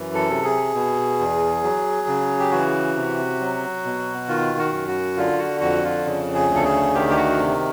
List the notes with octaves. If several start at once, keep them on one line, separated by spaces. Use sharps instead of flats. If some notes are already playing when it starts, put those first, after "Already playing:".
Already playing: F#2 E3
A4
C3
G#4
B2
E2
F#3
C#3
G4
E3 F#4
C3
F#3
B2
D#3 F4
F#4
F#2
F#4
D3 F4
F#4
F2 F#4
F4
C#3
G#4
D2
A4
G#4
D#3 G4
G4
F#4
C3